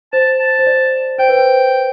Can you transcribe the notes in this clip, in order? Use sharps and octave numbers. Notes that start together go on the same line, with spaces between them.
C5 A5
A5
C5
D5
C5 G5
B4
C5